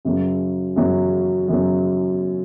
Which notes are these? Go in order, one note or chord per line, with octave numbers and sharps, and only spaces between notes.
F#2 C#3 F#3
F#2 C#3 F#3
F#2 C#3 F#3